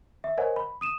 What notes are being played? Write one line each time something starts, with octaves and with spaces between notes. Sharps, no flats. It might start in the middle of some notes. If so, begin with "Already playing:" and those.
E5
A#4 C5 C#5 D#5 F#5 G#5
B5
D#6 D#7 E7